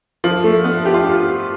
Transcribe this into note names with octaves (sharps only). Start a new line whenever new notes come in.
F3
A3
B3
G4
F4
G4